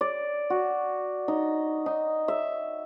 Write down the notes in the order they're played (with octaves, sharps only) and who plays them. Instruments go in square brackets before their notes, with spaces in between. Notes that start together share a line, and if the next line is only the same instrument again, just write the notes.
[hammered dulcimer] D5
F#4
D#4
D#4
E5